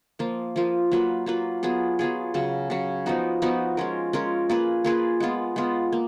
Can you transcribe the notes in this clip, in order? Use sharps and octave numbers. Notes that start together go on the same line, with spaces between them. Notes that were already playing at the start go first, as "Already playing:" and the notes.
F3 A#3 F4
F3 A#3 F4
F#3 A#3 F4 B4
F#3 A#3 F4 B4
F#3 B3 F4 G#4
F#3 B3 F4 G#4
C#3 F#3 C#4
C#3 F#3 C#4
F3 B3 D#4 F#4
F3 B3 D#4 F#4
G#3 C#4 F4 A#4
G#3 C#4 F4 A#4
A#3 F4 G#4 B4
A#3 F4 G#4 B4
G#3 B3 F4
G#3 B3 F4
A#3